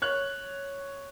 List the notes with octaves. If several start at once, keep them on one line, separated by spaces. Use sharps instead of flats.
C#5 F#6